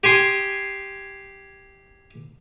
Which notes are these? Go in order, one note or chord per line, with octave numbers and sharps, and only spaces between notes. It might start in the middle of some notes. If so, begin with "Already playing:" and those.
G4 G#5 C6 D#6